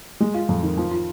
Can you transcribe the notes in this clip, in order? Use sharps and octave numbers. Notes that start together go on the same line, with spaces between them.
G#3
F4
F2
D#3
F3
F4